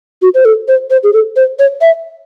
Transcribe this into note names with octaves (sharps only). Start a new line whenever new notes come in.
F#4
C5
A4
C5
C5
G#4
A4
C5
C#5
E5